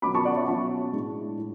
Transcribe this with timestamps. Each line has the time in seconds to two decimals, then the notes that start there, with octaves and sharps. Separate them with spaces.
0.02 B2 F#3 C#4 B5 D6
0.15 A5 C#6
0.25 D5 F#5
0.36 C#5 E5
0.47 B2 F#3 C#4 A5 C#6
0.92 A2 G#3 D4
1.38 A2